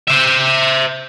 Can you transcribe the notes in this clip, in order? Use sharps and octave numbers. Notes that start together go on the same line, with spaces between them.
C5 E5